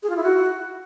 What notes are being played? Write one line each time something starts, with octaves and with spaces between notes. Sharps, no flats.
G#4
F4
E4
F#4